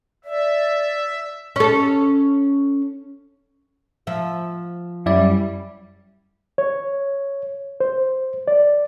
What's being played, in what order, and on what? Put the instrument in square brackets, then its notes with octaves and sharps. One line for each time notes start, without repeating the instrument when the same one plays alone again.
[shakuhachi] D5 [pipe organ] E5
[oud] C#4 A4
F3 E5
[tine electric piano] F#2 D5 [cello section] G3 [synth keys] E4
[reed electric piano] C#5
C5
D5